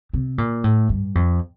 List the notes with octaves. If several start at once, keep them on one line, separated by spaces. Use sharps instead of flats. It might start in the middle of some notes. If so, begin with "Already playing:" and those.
C3
A#2
A2
G2
F2